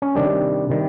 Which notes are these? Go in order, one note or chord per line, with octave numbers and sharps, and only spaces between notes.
C#4
C3 D#3 G3 D4
C3 D#3 G3